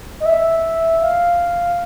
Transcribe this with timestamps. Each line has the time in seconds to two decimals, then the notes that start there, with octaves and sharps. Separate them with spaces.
0.20 D#5
0.25 E5
1.02 F5